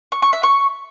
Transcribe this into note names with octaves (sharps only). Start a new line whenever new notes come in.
C#6
C#6
E5
C#6